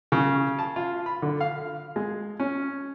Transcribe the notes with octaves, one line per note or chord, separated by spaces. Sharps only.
C#3
A5
F4
B5
D3
F5
G#3
C#4